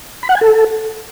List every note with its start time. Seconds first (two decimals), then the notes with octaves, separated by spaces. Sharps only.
0.23 B5
0.29 F#5
0.35 G#5
0.41 A4